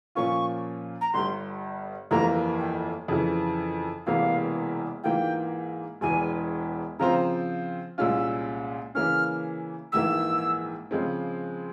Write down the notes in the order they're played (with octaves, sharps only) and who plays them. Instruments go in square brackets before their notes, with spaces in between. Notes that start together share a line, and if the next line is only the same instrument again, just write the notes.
[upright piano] A#2 F3 A#3 C#4 F4 [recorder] C#6
[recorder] A#5
[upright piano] G1 G2 G3 [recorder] C6
[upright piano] G1 F2 E3 G3 A#3 [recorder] A#5
[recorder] G5
[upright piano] F2 C#3 E3
[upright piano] E1 E2 C3 E3 A#3 [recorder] F5
[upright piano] G#2 E3 A#3 F4 [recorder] G5
[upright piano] E1 E2 E3 [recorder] G#5
[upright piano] C#3 F3 C4 F4 C5 [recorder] A#5
[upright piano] C2 A#2 G#3 C#4 F4 [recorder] E6 F6
[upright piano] C#3 E3 A#3 C#4 [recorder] F6
[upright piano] A#1 G#2 E3 A#3 [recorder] E6
[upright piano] C#3 F3 G#3 C4